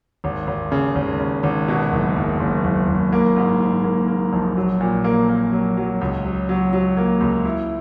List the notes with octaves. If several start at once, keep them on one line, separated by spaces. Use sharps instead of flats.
G#1
G#1
C#3
G#1
C#3
G#1
B2
F#1
F#1
F#1
F#1
F#1
A#3
G#2
G#2
A#3
A#3
A#1
F#3
A#2
A#3
A#3
F#3
F#3
C#2
F#3
F#3
F#3
A#3
C#2
E4